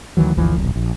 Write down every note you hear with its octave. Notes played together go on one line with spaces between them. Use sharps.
D2 D#3 E3 F#3
G1 D2 E3 F3
D#1 B1
A#1